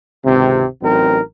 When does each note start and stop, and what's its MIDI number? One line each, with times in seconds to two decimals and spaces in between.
0.24 0.65 32
0.24 0.65 37
0.24 0.65 48
0.82 1.20 33
0.82 1.20 54
0.82 1.20 60
0.82 1.20 63
0.82 1.20 70